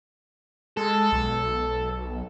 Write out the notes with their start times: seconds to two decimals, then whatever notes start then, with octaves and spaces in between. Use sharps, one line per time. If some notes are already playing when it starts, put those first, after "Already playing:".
0.77 G#3 A4
1.12 B1